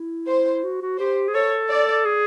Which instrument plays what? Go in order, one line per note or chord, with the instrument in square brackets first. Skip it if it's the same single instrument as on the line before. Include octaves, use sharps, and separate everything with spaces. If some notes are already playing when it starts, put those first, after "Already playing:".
Already playing: [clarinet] E4
[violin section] C5
[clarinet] F#4
F#4
[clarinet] G4 [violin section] C5
[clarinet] G#4
[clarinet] A4 [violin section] C#5
[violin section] D5
[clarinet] G#4